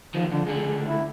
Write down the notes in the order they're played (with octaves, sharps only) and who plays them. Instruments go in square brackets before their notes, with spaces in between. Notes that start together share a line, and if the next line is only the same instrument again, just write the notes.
[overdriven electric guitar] E2 D#3 [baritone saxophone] F3
[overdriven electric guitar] F2 [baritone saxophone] D3
[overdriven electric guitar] C#2 D3 [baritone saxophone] G#4
[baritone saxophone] E4